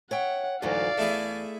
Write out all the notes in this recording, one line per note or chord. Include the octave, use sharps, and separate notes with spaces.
C#5 E5 F#5 G5
D2 G#2 E3 F#3 D5 F5
E2 A3 E4 G#4